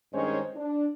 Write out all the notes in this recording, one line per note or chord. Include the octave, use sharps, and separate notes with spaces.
G2 D#3 G#3 C#4 C5 C#5
D4